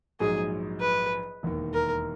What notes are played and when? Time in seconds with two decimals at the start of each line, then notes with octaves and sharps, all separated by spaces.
0.20 A#1 G#2 F#3 G#4
0.81 B4
1.43 E1 D#2 D#3
1.73 A#4